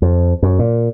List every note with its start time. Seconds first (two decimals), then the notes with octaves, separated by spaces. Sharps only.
0.02 F2
0.43 F#2
0.59 A#2